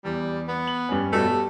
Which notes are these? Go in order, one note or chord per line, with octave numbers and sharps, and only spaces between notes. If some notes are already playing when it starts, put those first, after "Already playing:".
E2 G3
B3
F#7
G2 C#4
G2 B2 A3 C#5
G3